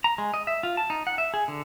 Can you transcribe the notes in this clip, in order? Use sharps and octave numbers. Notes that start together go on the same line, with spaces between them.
A#5
G#3
D#5
E5
F4
A5
D#4
F#5
E5
G#4
D3